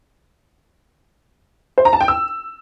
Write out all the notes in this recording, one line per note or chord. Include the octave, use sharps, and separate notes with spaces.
C5
A#5
A5
G5
E6